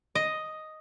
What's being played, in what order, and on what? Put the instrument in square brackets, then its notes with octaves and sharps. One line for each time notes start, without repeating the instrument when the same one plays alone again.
[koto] D#5